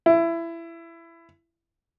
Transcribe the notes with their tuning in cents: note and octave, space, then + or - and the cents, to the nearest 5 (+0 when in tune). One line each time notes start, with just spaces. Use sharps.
E4 +20